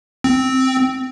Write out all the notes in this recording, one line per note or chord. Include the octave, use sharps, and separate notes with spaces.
C4